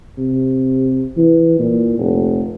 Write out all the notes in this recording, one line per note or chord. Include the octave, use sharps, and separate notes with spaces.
C3
E3
A#2
F1